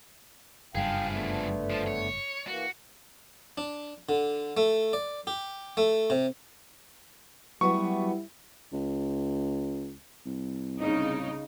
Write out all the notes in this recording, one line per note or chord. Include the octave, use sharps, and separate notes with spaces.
F#1 G2 F3 G#4 F5 G5
D3 A3 B3
F3
C#5
E3 A#3 F#4
D4
D3
A3
D5
G4
A3
C3
F#3 G3 A3 B3 E4 F#4 C#6
C#2
C2
C#3 D#4